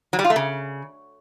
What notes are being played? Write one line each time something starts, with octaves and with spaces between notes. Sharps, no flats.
F#3
G3
F4
A3
C#3